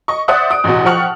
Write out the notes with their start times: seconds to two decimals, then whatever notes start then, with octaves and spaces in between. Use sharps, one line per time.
0.08 D#5 C#6
0.28 C5 D5 E5 F#5 D#6 F#6
0.51 D#6 D7
0.64 A1 E2 B2
0.85 F3 G4 F#5 C#6 F6 F#7